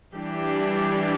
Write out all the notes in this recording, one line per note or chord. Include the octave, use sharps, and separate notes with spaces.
E3 G3 D4 G4